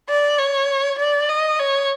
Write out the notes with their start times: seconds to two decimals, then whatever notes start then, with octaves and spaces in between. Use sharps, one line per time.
0.09 D5
0.39 C#5
0.99 D5
1.29 D#5
1.59 C#5